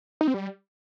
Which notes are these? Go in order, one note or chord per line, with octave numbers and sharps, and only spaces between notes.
D#4
C4
G3